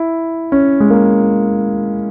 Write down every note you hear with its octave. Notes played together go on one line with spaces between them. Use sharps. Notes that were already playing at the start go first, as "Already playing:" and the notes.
Already playing: E4
C#4
G#3
A#3